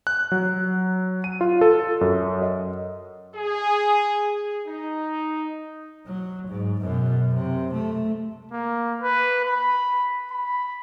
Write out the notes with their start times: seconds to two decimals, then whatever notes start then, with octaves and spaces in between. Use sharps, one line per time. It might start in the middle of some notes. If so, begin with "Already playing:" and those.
0.07 F#6
0.32 F#3
1.24 D#7
1.41 F4
1.61 A4
2.01 F#2
2.42 D#5
3.35 G#4
4.67 D#4
6.07 F#3
6.49 G#2
6.80 F#2 B2
7.35 C3
7.74 A3
8.52 A#3
9.01 B4
9.45 B5
10.31 B5